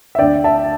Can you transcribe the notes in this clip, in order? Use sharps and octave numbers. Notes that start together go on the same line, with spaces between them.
E5
D2 D3 D5 G5
E5 A5